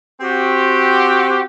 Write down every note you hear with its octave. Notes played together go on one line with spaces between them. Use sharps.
C4 F#4 G4